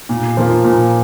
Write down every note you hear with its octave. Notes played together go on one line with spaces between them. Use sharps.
A#2
F3 A#3 F4
A#2